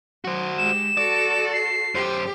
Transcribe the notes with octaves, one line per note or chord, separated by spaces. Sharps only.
F#3 F#4 C5
G#3 G4 E7
F#4 A4 D5
C7
F#2 G4 C5